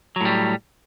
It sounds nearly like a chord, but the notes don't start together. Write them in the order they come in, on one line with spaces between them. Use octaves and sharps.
F#3 A2 G3